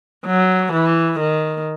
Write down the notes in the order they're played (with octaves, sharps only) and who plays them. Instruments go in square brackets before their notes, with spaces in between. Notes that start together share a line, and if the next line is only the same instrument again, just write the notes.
[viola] F#3
E3
D#3